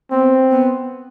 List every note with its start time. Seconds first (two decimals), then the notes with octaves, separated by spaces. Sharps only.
0.11 B3 C4
0.51 B3